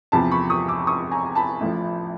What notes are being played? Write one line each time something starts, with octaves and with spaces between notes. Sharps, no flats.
E2 C3 F3 A5 B5
B5 C#6
C#6 D#6
D6 E6
C#6 D#6
G#5 A#5
A5 B5
A1 A2 F3